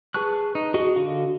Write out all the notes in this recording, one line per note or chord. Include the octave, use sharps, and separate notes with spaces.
G#4 B4 A5 C#6 F#6
D#4
F#4 G#4 D#5
D3 F#4 F5